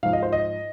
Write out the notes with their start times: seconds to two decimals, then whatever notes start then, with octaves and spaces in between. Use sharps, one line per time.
0.03 G#2 F3 F5
0.13 D#5
0.23 C5
0.33 D#5